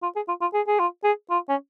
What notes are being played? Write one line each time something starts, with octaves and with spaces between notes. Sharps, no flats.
F4
G#4
F4
F4
G#4
G#4
F4
G#4
F4
C#4